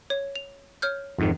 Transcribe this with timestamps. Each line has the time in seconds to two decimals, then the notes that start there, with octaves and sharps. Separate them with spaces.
0.10 C#5
0.35 F7
0.82 C#5 F6 G6
1.18 F2 G#2 D#3